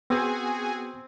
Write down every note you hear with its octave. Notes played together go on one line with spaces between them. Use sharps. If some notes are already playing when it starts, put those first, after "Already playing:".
B3 C4 F#4 G#4 G#5